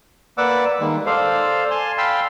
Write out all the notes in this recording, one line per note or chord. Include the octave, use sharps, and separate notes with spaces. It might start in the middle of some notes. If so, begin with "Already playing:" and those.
A#3 B4 D5 F#5 D6 E6
D#3 G3 G#3 A#3
A4 C5 D5 F5
G#5 A5 C6
F5 G5 A5 B5 C6 E6